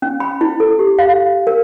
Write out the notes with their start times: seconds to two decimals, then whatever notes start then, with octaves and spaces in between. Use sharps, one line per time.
0.02 C#4
0.20 B5
0.41 E4
0.60 A4
0.79 G4
0.99 F5
1.47 A#4